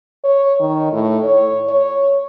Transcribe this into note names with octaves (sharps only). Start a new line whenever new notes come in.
C#5
D#3
A2
C#5
C#5